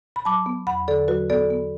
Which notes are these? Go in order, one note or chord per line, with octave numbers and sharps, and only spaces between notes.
B5
F#3 A5 D6
B3
E2 F#5 B5
D3 A4 D5
F#3 F#4 B4
B3 A4 D5
B3